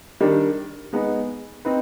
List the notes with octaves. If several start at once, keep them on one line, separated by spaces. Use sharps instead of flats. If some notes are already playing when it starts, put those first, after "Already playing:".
D#3 G3 D4
G#3 B3 D#4
C4 D#4 B4